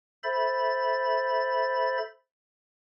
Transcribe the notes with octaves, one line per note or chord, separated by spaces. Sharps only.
A4 C5 E5 B5 A6